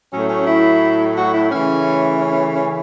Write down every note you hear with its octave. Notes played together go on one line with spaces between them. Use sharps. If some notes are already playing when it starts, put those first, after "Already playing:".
A2 F#3 A3 C#4
C#4
E4
F#4
E4
C#3 E3 A3 C#4
C#4
C#4
C#4